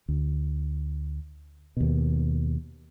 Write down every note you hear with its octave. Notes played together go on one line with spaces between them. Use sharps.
D2
D#2 B2